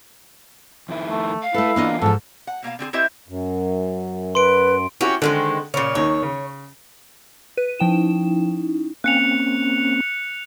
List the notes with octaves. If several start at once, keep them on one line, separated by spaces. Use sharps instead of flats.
F2 D#3 E4
A3
F5
A3 E4 A4 B4
E3 A#3 B3 D4 F4 D#5
G#2 F3 A4
F#5
B2 A#3 B3 F5
D3 C4 G4 G#4
C4 E4 G4 C5 D#5 E5
F#2
B4 C6 D7
C#4 E4 F#4 G4
D3 D#3 G#3 C4
A#2 C#3 C#4
D#2 D#3 D#4 C#5
C#3
B4 D#7
F3 C#4 D#4 E4 G5 E7
A#3 C4 C#4 F#6 C#7 F7